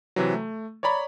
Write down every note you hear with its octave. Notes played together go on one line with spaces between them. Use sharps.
C3 E3 F#3
A3
C#5 D5 A#5 B5